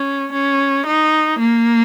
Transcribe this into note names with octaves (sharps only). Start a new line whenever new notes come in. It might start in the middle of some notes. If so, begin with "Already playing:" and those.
Already playing: C#4
C#4
D#4
A#3